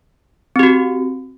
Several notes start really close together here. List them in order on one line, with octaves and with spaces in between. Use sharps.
C4 G4 F#4